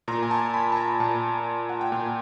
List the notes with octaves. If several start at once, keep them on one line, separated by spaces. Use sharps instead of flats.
A#2 A#5
G#5
A5
B5
A5
A#5
A#2 A5
F#5
G5
A#2 G#5